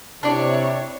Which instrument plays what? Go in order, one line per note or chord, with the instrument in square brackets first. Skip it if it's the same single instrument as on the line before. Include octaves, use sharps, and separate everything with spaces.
[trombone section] C3 [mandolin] D4 D5 [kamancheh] E4 C#5